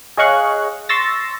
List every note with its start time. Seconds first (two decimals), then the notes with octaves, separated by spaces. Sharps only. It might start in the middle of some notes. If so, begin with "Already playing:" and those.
0.17 G#4 C#5 D#5 F5 C#6 F#6
0.89 C6 C#6 E6 A6 A#6